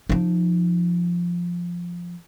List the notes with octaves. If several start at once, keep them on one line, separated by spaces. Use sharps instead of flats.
F3 D#4